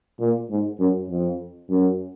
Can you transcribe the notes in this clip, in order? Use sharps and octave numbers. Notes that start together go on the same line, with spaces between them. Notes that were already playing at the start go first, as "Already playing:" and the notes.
A#2
G#2
F#2
F2
F#2